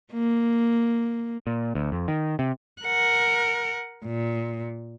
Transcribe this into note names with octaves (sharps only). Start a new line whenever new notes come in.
A#3
A#2
D2
F2
D#3
C3
A#4 F#5
A#2